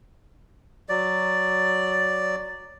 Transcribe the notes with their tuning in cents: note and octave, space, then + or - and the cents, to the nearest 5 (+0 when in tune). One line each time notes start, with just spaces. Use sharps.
F#3 +0 D5 +0